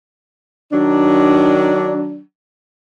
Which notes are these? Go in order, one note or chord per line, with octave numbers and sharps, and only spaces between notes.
D#3 F#3 D4